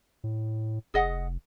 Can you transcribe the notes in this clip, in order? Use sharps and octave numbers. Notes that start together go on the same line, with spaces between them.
A2
F1 G#4 D#5 F#5